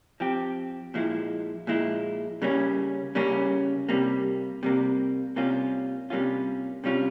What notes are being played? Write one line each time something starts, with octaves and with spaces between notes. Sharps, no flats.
F3 C4 G4
A#2 F3 G#3 E4
A#2 F3 G#3 E4
C#3 G3 A#3 C#4
C#3 G3 A#3 C#4
C3 G3 A#3
C3 G3 A#3
C3 G3 A#3 C#4 F4
C3 G3 A#3 C#4 F4
C3 G3 C#4 F4